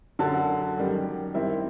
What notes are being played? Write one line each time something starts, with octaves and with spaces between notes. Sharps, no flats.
F#2 D3 F#3 A5
F#5
F#2 D#3 G3
D#3 G3 C4 E4 E5